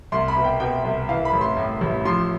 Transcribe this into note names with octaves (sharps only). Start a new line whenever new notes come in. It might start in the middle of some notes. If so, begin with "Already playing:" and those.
C2 C6
B5
B2
G5
B2 G5
C2
E3 F5
B5
A1
C6
A2
A1
F3 C6